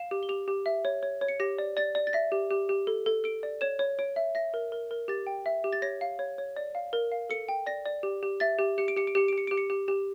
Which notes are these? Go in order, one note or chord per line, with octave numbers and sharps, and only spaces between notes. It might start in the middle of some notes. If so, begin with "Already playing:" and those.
Already playing: F5 E7
G4
G7
G4 F7
G4
E5
C#5
C#5
C#5
C#7
G4 A#6
D5
D5 A6
D5
A6
E5 A#6
G4
G4
G4
A4
A4
A4 D7
D5
C#5 E7
C#5
C#5 D7
E5
E5 A#6
A#4
A#4
A#4
G4 A6
G5
E5
G4
A6
C#5 A#6
F5
C#5
C#5
D5
F5
A#4
F5
A4 C#7
G5
D5 A#6
D5
G4
G4
E5 A6
G4
G4 C#7
D7
G4 C#7
D7
G4 C#7
G4 D7
C#7
G4 D7
C#7
G4
G4 E7